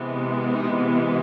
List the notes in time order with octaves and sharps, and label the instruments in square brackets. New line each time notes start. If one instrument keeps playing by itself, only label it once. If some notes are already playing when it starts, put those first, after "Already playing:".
Already playing: [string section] C3 E3 G#3 B3
D#4